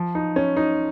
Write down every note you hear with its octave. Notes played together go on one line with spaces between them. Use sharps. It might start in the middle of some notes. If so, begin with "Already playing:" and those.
Already playing: F3
D#4
C#4
D#4